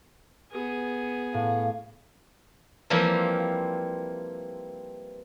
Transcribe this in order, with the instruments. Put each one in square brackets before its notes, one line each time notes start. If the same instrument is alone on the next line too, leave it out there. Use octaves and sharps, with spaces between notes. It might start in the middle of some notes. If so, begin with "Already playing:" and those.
[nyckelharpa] B3 G#4
[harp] A2 [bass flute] F5
[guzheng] E3 F3 G3 A#3 C4 F4